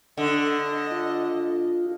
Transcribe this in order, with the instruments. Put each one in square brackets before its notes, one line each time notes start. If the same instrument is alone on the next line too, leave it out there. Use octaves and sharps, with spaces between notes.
[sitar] D3 [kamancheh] D#5
[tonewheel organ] F4